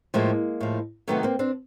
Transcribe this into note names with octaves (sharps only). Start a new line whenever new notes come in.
A2 F3 G#3 A#3
A2 F3
C3 D#3 F#3 A3 B3
A#3 C4
C4 D4